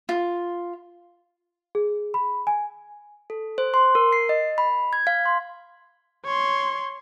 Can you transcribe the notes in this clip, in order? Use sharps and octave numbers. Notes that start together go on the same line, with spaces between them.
F4
G#4
B5
G#5
A4
C5
C6
A#4
C7
D#5
B5
G#6
F5
C6
C#5 C6